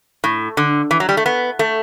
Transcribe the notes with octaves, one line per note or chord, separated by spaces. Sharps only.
A2
D3
E3
F#3
G3
A3
B3
A3